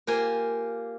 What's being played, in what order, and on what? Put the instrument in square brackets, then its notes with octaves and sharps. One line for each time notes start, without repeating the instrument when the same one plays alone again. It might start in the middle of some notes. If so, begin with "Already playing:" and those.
[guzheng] A#3 F4 G4 A#4 C5 G#5